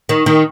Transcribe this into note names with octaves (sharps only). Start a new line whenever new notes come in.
D#3
D#3